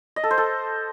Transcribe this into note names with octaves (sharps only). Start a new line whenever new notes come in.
D#5
A4
C5
A4